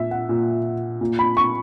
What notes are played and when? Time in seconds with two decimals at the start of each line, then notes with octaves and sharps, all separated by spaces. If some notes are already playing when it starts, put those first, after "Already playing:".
Already playing: A#2 E5
0.11 F#5
0.29 A#2
1.01 A#2
1.19 B5
1.37 C#6